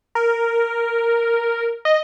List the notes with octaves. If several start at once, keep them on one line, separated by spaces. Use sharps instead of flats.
A#4
D#5